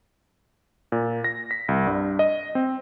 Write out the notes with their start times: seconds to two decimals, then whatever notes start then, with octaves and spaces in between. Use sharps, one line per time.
0.92 A#2
1.24 A#6
1.51 B6
1.68 C2
1.87 G2
2.19 D#5
2.55 C4